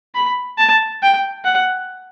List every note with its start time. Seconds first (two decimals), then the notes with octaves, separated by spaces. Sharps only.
0.15 B5
0.58 A5
1.02 G5
1.45 F#5